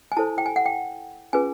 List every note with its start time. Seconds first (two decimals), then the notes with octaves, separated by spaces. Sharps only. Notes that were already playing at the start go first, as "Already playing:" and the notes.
0.12 G#5
0.17 E4 A4 C5 A5
0.38 G5
0.46 G#5
0.56 F#5
0.66 G5
1.33 C#4 F4 G#4 B4 G#5